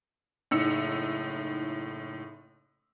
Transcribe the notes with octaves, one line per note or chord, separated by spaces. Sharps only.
F#1 A2 D#4 E6 C#7